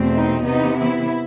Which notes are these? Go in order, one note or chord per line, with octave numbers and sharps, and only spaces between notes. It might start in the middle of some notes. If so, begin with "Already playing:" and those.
Already playing: E2 B2 A3 C4
D#4
C3 E3 B3 D#4
E4